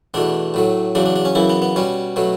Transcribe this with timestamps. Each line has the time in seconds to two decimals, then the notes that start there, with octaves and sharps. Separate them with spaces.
0.14 E2 B2 A3 D4
0.54 A2 F#3 A3
0.95 E2 C#3 F#3 D4
1.06 D4
1.16 D4
1.25 C#4
1.35 F#2 C#3 E3 E4
1.49 B3
1.62 B3
1.76 B2 G3 C#4
2.16 B2 F#3 A3